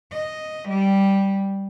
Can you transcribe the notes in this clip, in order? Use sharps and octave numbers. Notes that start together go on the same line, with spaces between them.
D#5
G3